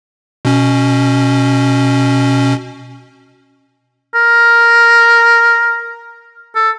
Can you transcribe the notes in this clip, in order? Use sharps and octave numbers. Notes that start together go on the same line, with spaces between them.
B2 C#4
A#4
A4